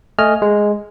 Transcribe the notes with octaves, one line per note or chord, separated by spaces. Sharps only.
A3 D#5 G#5 F6
G#3